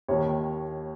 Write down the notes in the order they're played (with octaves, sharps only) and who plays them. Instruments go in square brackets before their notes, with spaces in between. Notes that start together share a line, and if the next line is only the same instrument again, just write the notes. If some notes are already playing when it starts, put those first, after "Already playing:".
[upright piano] D#2 D#3 C#5